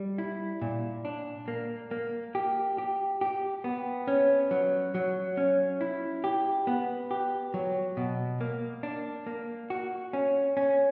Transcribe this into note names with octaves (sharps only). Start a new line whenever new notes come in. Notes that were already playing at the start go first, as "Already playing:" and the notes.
Already playing: G3
E4
A#2
D4
A#3
A#3
G4
G4
G4
B3
C#4
F#3
F#3
C#4
E4
G4
B3
G4
F#3
B2
A#3
D4
A#3
F#4
C#4
C#4